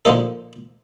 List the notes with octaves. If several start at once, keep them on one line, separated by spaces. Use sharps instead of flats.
A#2 D3 F3 A#3 D#4 A4